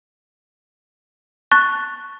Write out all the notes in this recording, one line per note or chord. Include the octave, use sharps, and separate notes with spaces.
A5 C#6 F#6 A6